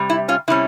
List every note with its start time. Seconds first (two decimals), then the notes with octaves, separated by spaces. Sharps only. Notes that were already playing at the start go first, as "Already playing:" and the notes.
Already playing: C3 G3
0.10 E4
0.28 C#4 F4
0.48 C3 G3 C#4 E4